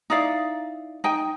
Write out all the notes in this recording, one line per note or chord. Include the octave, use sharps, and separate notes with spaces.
D#4 E4 D5 F5
D#4 G5 G#5